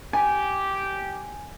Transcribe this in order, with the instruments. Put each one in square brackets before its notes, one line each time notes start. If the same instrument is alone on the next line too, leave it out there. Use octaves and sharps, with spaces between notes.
[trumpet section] G4 [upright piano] G#5